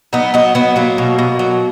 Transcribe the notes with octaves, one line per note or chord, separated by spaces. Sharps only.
F#3 B3 D#4
F#3 B3 D#4
F#3 B3
F#3 A#3
B2
B2
F#3